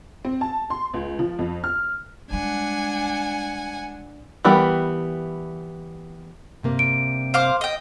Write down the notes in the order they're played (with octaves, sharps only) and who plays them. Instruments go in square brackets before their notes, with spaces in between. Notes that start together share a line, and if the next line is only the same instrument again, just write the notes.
[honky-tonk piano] C4
A5
C6
C#2
F3
F2
F6
[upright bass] G3 G#3 [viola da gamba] D4 [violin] F#5 G#5
[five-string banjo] E3 G3 B3 A#4 G5
[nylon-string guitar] G2 C3 A#3
[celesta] D7
[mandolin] C5 F5 D6
D#5 G5